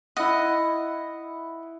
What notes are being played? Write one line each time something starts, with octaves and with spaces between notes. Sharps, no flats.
E4 D#5 F#5